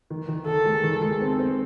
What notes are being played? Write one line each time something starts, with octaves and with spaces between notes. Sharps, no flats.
D#3
D#3
D#3 A4
G#3
D#3
G#3
C4
C4